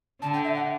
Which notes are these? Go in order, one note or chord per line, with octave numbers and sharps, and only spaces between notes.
D3 A5
G5
E5
F#5